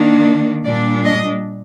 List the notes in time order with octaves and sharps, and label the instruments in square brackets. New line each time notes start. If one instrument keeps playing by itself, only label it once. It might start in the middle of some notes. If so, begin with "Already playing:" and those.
Already playing: [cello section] D#3 A#3 D4
A#2 G3 D4 D5
D#5